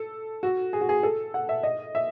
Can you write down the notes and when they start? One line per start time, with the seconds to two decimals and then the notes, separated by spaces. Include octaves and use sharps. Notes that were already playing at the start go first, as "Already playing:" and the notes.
Already playing: A4
0.43 F#4
0.73 G#4
0.81 F#4
0.89 G#4
1.03 A4
1.34 F#5
1.49 E5
1.63 D#5
1.95 E5